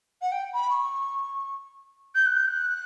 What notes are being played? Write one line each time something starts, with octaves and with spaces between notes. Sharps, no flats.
F#5
G5
B5
C#6
G6
F#6
G6
F#6